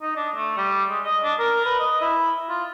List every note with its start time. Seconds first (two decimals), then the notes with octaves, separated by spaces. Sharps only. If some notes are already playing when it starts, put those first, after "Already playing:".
0.02 D#4
0.16 D4
0.35 A3
0.58 G3
0.89 G#3
1.04 D#5
1.24 D4
1.39 A#4
1.65 B4
1.79 D#5
2.01 E4
2.49 F4